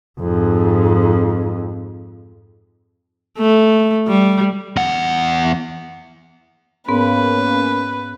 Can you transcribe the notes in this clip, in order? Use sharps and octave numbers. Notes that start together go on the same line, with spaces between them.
F2 G#2
A3
G3
E2 F#5
G#2 A#3 B3 C#4 B4